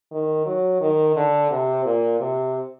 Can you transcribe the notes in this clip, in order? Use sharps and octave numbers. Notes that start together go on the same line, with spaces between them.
D#3
F#3
D#3
D3
C3
A#2
C3